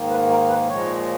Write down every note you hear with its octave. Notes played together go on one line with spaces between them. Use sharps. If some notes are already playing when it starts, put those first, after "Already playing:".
Already playing: G#2 D#3 A#3
B4
A#4
B4
A#2 F3 G#3 C#5